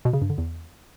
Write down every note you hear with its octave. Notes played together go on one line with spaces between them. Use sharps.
B2
C#3
G2
D3
E2